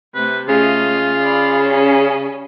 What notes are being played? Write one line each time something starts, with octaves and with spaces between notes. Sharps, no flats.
C3 A3 B4
C#3 A3 F4 D#5
D5 B5
G3 C#4